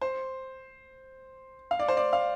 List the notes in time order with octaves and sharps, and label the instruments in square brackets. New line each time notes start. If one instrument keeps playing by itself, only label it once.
[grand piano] C5
F5
D5
C5
D5
F5